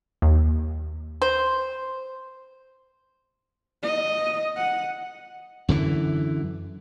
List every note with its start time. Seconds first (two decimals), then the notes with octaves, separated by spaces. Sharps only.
0.22 D#2
1.22 C5
3.83 D#5
4.57 F#5
5.69 F#2 D3 E3